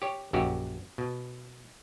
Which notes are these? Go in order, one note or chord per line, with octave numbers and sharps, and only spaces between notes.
G4 C#5
A#1 F#2 F#4 G4
B2